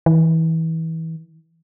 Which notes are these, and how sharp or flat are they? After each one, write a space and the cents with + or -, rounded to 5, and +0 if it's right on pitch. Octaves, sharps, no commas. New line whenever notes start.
E3 -30